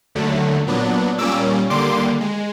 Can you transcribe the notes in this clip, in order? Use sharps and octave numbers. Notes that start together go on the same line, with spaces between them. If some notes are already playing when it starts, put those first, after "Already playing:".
D#2 D3 F#3 A3
A#2 F#3 B3 D4
A#2 G3 A#3 C#4 D6 E6
D#2 D3 G3 A#3 C6 D6
G#3